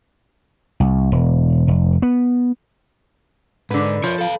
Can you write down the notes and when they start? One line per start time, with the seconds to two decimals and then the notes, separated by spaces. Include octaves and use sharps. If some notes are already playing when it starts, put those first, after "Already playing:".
0.80 C2
1.12 E1
1.68 F1
2.02 B3
3.71 G#2 D3 B4
4.04 F3 A#4 C#5
4.18 A4 F5